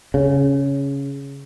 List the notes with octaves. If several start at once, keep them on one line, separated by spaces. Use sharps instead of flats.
C#3